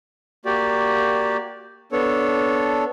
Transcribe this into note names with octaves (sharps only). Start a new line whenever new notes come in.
A#3 F#4 G4 D5
B3 D4 A4 C#5